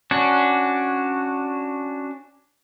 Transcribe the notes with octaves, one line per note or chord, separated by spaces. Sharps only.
C#4 D4 F#4